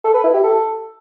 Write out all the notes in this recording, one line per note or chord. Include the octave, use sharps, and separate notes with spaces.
A4
B4
E4
G4
A4